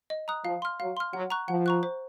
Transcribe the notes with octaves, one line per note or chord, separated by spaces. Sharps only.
D#5
A#5 D#6 F#6
F3 F5
C6 F6
F#3 F5
C6 F6
F#3 F#5
A#5 C#6 F#6
F3 F#5
A#5 C#6 F#6
C5